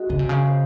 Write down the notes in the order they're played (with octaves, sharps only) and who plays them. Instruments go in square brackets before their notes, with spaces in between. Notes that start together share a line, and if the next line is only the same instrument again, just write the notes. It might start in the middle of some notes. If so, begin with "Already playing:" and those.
Already playing: [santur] G#3 F#4
[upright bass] C#3 [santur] D#5
[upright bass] C3
C#3
[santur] C5